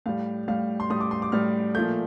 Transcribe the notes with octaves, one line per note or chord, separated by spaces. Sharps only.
A2 G3 F5
A2 G3 F5
C6
A2 G3 D#6
D6
C6
D6
A2 G3 F6
A#2 F3 A3 G6